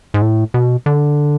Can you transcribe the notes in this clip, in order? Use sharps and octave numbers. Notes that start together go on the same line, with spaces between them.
G#2
A2
B2
D3